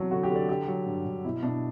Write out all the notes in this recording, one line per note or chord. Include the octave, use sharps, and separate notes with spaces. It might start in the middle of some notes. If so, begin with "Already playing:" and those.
Already playing: E2 C3 F#3 A4
D3 F#4
G4
D3
D5
D3 G4
F#3
G2
G2
B2 E4
B2 D4